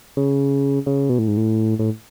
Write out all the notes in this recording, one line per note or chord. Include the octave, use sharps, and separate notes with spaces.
C#3
C#3
B2
A2
G#2
A2
A2